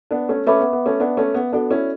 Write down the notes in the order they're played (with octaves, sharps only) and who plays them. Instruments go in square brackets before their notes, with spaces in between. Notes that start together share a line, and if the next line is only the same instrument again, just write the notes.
[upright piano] B3 D4
A3 C#4
[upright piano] A3 C#4 [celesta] B4 E5 B5 D6
[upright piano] B3
B3
A3 C#4
B3 D4
A3 C#4
B3
[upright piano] B3 D4 [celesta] F#4 A4 D5
[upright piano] C#4 E4